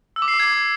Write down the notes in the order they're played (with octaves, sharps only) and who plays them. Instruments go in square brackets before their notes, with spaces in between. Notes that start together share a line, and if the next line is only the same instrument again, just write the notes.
[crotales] E6
D6
C7
D6
G#6